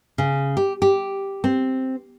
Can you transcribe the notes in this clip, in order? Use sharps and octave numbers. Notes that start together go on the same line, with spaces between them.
C#3
G4
G4
C4